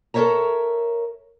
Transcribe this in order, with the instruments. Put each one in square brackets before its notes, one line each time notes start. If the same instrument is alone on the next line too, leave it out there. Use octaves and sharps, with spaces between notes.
[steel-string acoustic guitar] A4 A#4 C5 C#5 E5 A#5